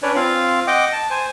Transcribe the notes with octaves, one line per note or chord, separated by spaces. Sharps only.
C#4 D4 B4 C#5 D5
C4 F4 F5
D#5 F#5 G5 D6
A5
C5 G#5